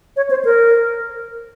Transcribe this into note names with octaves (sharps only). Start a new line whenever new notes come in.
C#5
C5
A#4